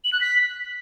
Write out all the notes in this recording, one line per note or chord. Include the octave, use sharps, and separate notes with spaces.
F#7
F#6
B6